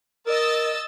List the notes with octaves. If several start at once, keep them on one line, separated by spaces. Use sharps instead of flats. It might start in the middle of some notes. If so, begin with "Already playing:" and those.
A#4 D#5 E6 A6